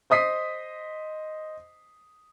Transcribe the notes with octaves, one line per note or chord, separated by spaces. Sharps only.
C5 D#5 D#6 B6 C7